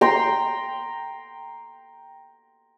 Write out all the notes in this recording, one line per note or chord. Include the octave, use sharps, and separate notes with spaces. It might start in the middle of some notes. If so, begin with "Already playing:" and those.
G5 A#5 C6